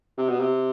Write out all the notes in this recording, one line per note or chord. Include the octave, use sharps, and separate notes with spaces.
C3
B2
C3